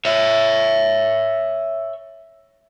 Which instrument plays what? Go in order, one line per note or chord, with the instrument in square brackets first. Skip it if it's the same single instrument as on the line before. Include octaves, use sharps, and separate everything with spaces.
[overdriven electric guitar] C#5 E5